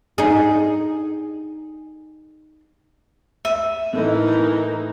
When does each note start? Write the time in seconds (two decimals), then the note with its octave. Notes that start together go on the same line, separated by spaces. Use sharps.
0.18 D#4 G#4
3.45 E5 D#7
3.93 A2 E3 D#4 A4 A#4 D#5